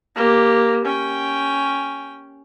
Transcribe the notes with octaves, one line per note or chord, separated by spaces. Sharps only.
A#3 G4
C#4 G5